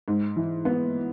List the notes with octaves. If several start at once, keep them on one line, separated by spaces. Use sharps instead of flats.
G#2
E3
B3